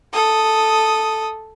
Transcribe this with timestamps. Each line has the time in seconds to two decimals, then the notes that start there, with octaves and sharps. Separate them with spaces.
0.14 A4 D#6